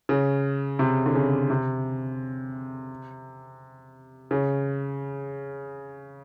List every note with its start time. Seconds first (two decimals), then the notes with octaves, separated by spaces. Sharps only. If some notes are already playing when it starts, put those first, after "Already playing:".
0.09 C#3
0.79 C3
1.06 D3
1.15 C#3
1.50 C3
4.31 C#3